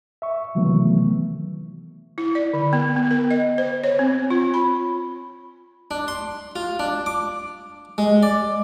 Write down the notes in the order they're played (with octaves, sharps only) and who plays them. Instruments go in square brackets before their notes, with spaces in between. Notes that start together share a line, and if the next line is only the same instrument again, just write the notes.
[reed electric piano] E5 C#6
C3 D#3 E3 F#3 A3 B3
[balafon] E4
D5
D3
B3
B3
A#4
D#5
C5
C#5
C4
F4
B5
[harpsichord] D4
C6
F4
D4
D6
G#3
D5